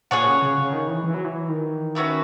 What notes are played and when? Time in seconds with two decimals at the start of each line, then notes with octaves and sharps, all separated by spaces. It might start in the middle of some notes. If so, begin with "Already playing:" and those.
0.11 A#2 G#4 C#5 F#5
0.27 C#3
0.42 C#3
0.58 C#3
0.73 D#3
0.88 E3
1.04 E3
1.14 F#3
1.25 E3
1.49 D#3
1.95 C#4 F#4 B4 E5